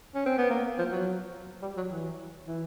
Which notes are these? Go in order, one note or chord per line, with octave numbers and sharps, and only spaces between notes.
C#4
C4
B3
A#3
F3
F#3
G3
F#3
E3
E3